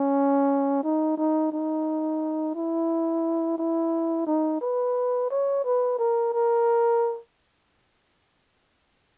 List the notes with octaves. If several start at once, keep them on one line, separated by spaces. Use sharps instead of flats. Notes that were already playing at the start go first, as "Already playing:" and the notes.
Already playing: C#4
D#4
D#4
D#4
E4
E4
D#4
B4
C#5
B4
A#4
A#4